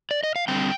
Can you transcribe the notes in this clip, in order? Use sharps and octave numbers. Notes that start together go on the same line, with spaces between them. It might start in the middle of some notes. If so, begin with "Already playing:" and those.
D5
D#5
F5
D3 G3 C4 G5